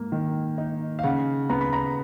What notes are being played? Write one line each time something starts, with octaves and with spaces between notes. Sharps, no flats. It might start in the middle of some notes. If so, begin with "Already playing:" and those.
Already playing: G#2 A#3
D#3
D#4
F5
C#3 F#5
B3 A#5
B5
A#5